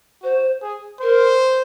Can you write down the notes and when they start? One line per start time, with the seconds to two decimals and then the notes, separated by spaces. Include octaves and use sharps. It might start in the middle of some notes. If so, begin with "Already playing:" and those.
0.22 F#4 C5
0.62 G#4
1.01 A#4 C5